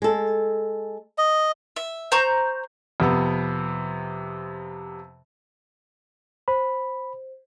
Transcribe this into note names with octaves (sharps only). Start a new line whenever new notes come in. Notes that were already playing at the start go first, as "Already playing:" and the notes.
G#3 A4
D#5
E5
C5 A#5 C#6 G6
F2 C3 B3
C5 B5